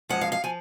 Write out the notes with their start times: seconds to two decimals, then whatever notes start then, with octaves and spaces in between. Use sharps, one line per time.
0.09 F#2 F3 G#3 F#5
0.21 F5
0.32 F5
0.44 F3 G#5